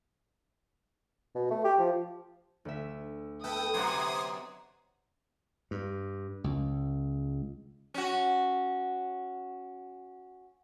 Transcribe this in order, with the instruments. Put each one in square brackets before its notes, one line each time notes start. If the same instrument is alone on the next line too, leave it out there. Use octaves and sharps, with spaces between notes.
[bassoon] B2
A3
G4
F3
[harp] D2 E5
[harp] B3 E5 [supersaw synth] A4 G5 [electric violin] D#6
[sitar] F#2 C3 [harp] G4 D#5 F#5 [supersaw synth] C6 D6 G#6
[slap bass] G2
C#2
[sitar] C#4 F#4